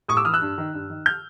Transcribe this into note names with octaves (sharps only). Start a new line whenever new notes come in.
A2 C#6 D#6
D6 E6
E3 D#6 F6
E6 F#6
G2
D#3
G2
D#3
F6 G6